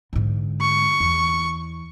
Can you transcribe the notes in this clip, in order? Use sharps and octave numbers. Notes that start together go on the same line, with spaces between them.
G#2 D3
C#6
E2